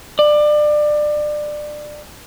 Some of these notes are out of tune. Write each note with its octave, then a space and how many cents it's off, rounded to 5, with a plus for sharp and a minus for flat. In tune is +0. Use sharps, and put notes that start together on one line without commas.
D5 +25